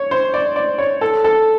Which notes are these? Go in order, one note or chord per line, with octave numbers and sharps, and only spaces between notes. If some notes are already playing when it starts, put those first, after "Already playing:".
Already playing: C#5
C5
D5
D5
C#5
A4
A4